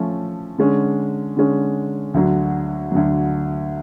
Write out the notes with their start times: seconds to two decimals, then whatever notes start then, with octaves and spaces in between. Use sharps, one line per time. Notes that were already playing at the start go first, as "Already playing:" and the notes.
Already playing: F3 A3 C#4
0.58 D3 G#3 C#4
1.37 D3 G#3 C#4
2.14 D2 D3 F#3
2.92 D2 D3 F#3